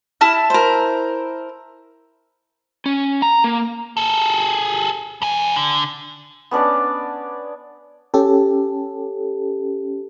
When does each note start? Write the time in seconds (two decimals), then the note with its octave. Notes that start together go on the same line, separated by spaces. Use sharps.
0.21 E4 A5 F6
0.50 A#4 C5
2.86 C#4
3.22 A#5
3.44 A#3
3.97 G#4 A4
5.22 F2 G#5
5.56 D3
6.51 B3 C#4 D4 D5
8.14 C#4 G4 A4